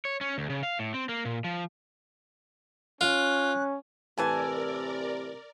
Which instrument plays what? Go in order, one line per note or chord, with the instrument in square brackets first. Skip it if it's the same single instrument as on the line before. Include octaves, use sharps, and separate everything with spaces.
[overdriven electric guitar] C#5
C#4
D2
C#3
F5
A2
C4
A#3
A#2
F3
[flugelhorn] C#4 [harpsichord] F4 [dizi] F#6
[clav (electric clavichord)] A2 E3 [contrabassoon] C3 [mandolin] E4 G#5 A5 [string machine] A#4 D5